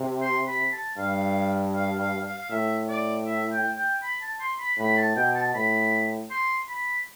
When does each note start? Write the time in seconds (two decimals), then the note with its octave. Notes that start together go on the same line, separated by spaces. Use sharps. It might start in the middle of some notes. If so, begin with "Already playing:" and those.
Already playing: C3
0.22 C6
0.47 B5
0.72 A5
0.97 G2 F5
1.74 F5
2.00 F5
2.25 F5
2.38 F5
2.50 A2 E5
2.88 D5
3.26 E5
3.52 G5
3.77 G5
4.03 B5
4.22 A5
4.40 C6
4.59 B5
4.78 A2 B5
4.97 A5
5.16 B2 G5
5.35 A5
5.55 A2 B5
6.31 C6
6.69 B5